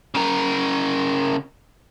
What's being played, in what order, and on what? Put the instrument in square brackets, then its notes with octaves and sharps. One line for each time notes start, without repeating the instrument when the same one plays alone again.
[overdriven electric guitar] C#3 A#4